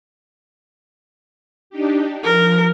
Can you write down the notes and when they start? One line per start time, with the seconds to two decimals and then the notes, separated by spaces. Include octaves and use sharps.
1.70 D4 D#4 G4
2.24 F3 A#4